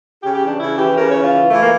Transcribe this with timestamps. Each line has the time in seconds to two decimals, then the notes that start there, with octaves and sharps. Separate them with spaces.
0.22 C#3 G4
0.35 G4
0.42 E3
0.47 D4
0.59 C#3 E4
0.78 E3 G4
0.97 C#3 A#4
1.09 C#5
1.16 E3
1.22 F4
1.35 E3
1.50 E3 A3
1.62 A#3